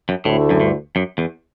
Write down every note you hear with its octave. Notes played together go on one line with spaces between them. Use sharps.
F#2
D2 A2 D3 A3 E4
F#2
G2
F#2
E2